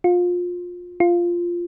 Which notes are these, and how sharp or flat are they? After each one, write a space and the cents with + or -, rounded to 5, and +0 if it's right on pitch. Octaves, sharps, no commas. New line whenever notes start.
F4 +25
F4 -5